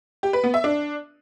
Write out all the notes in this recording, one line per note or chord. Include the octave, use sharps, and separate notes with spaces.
G4
B4
B3
E5
D4